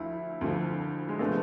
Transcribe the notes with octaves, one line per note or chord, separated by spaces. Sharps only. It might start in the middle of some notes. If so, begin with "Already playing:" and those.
Already playing: D2 D3 F3 E4
D2 D3 F3
G#3
C3 F3 A3 B3 D4